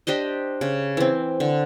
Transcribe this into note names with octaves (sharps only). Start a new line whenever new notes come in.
D4 G4 C5 D#5
C#3
E3 C4
D3